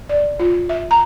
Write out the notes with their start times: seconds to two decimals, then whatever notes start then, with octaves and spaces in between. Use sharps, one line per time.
0.09 D5
0.39 F4
0.69 E5
0.91 A#5